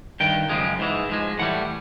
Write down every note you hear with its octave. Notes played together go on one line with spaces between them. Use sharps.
G2 D#3 G5
F#2 C#3 F3 G#3
G#2 E3 G#3
G#2 F3 G#3
A2 E3 G3 F#5